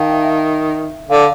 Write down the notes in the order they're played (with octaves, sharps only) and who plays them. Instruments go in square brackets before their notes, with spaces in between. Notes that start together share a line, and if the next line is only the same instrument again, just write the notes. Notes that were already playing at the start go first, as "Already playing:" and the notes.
Already playing: [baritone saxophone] D#3 [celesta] F5 G5 A5
[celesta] E5
E5
[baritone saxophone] D3 [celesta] F5